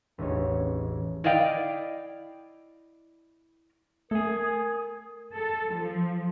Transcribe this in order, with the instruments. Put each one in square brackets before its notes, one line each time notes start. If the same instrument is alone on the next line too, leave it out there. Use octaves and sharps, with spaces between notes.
[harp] E1 A1 D#4 C#5
[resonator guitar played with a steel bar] E4 D5 D#5 F5 G5
[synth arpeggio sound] A3 [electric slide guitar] A4 G#5 [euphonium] A#4 [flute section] D#6 G#6
[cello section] A4
F3